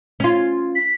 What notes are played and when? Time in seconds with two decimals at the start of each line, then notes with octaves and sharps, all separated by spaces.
0.20 C#4 F4
0.75 B6